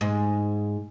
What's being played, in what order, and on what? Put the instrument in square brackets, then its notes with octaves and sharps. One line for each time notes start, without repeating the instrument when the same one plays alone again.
[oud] G#2